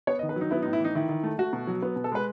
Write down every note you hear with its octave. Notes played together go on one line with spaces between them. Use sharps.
B3 C#5
D#5
D#3
B4
F#3 D#4
B3 E4
D#4
A2
E4
E3 D#4
D#3 E4
D#3
A3
A3 F#4
B2
F#3
B3
B2
A4
G#3 B4